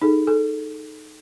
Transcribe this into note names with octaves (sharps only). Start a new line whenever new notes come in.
D#4 G#4 A4
A4